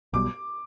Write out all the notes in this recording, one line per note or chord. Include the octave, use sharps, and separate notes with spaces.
B1 B2 G3 D6